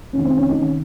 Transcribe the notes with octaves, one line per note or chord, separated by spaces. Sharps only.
F2 C3 D#3 C#4
C4
C#4
D#4
C3 D#3 C#4